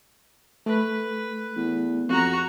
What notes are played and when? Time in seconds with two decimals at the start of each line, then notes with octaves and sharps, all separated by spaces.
0.66 A3 B4
1.57 E2
2.09 F2 F#4 A#5